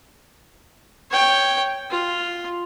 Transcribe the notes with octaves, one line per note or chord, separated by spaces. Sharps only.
C#5 G5
F4